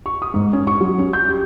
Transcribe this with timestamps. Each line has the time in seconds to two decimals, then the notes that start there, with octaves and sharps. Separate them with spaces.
0.06 C#6
0.22 D#6
0.34 G#2
0.53 C#4
0.67 C#6
0.81 F#3
0.99 C#4
1.13 G6
1.29 G4